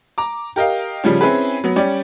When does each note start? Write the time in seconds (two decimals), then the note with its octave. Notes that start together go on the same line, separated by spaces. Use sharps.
0.18 A#5 D6
0.56 G4 A#4 D#5 F5
1.04 C#3 F3 G3 C#4
1.21 C4 C#4 E4 G#4 B4
1.64 F#3 B3
1.76 G3 C#4 G4 D5